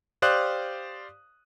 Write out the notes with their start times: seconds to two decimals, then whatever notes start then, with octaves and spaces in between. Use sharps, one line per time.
0.22 G4 C5 D5 F5 D#6 F#6